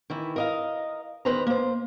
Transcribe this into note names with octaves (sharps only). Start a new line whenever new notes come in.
D#3 E3 E4
A#4 D#5 F5
E2 D#3 B4 C5 D#5 A#5
A#3 C5